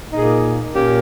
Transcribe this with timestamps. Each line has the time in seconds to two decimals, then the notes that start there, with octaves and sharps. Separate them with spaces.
0.11 A#2 A#3 D#4 G#4
0.73 A#2 A#3 C#4 G4